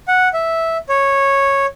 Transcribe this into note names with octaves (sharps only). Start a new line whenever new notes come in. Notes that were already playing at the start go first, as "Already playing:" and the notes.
F#5
E5
C#5